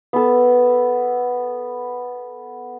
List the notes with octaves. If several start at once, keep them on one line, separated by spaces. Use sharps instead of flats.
B3 A4